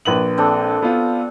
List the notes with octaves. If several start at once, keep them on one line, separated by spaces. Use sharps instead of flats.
A#1 B4 F#7
C4 D4 A4
B3 F4